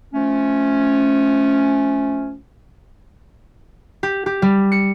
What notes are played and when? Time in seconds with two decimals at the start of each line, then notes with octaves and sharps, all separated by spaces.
0.14 F3 A3 C#4
4.03 G4
4.26 G4
4.42 G3
4.72 C#7